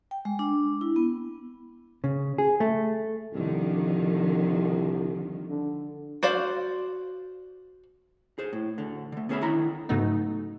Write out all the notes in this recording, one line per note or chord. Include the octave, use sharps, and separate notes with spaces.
G5
G#3
D4
E4
B3
C#3
G#4
A3
C2 D3 D#3 F3
D3
F#4 C5 D5 F5
G#4 C5
A2
D2 D3
D3 A3
B3 C#4 G#4 A#4 E5 B5
D3 D#3 E4 A#5 B5
G#2 C#3 F#3 A3 B3 D#4